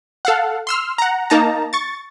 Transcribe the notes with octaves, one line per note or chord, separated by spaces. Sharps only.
A4 F5 F#5
C6 E6 F6
F#5 A#5
A#3 D#4 A5 A#5
C#6 A6